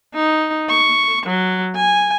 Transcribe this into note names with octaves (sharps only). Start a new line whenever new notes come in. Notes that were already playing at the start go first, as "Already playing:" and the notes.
D#4
C#6
F#3
G#5